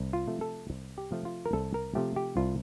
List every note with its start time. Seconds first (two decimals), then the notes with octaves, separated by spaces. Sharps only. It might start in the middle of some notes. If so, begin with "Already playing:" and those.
Already playing: C2
0.13 F4
0.28 C3 F3 A3
0.41 A4
0.70 C2
0.98 G4
1.11 C3 F3 A3
1.25 F4
1.46 A#4
1.53 C2 A4
1.74 A#4
1.95 C3 F3 A3 G4
2.16 G4
2.37 C2 F4